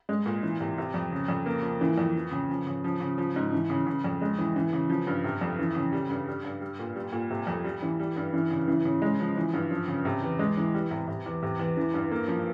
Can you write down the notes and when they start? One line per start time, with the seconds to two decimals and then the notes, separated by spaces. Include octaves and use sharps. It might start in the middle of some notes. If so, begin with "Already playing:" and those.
0.09 G#3
0.26 A#2
0.43 E3
0.60 C3
0.78 C3
0.94 F2
1.12 C#3
1.28 F2
1.46 A#3
1.63 F3
1.81 E3
1.98 F2
2.15 F3
2.32 C#3
2.49 F3
2.67 C#3
2.84 F3
3.00 C#3
3.18 F3
3.36 G#2
3.52 E3
3.70 C#3
3.87 C#3
4.04 F2
4.22 G#3
4.39 E3
4.56 E3
4.73 C#3
4.90 F3
5.07 G2
5.24 C3
5.41 F2
5.59 E3
5.75 C#3
5.93 G3
6.09 G2
6.28 G3
6.45 G2
6.61 G3
6.79 A#2
6.96 G3
7.13 A#2
7.30 C3
7.47 F2
7.64 G3
7.82 E3
8.00 G3
8.16 G2
8.33 E3
8.51 C#3
8.68 E3
8.85 C#3
9.02 G#3
9.20 F3
9.37 E3
9.53 G2
9.71 F3
9.88 C#3
10.05 C3
10.22 E2
10.39 G#3
10.57 E3
10.74 G3
10.91 C3
11.08 C3
11.26 E2
11.43 C3
11.59 E2
11.77 E3
11.94 G2
12.11 A#3
12.28 F3